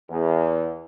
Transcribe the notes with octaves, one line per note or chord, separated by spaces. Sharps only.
E2